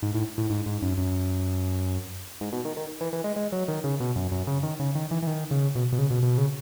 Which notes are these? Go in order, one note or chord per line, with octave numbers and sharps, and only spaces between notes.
G#2
A2
A2
G#2
G#2
F#2
F#2
G#2
B2
D#3
D#3
E3
E3
G#3
G#3
F#3
D#3
C#3
B2
F#2
F#2
C#3
D#3
C#3
D#3
E3
E3
D#3
C#3
B2
B2
C#3
B2
B2
C#3